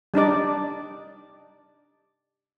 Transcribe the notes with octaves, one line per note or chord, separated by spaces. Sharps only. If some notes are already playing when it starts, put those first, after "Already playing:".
G3 D4 D#4 D5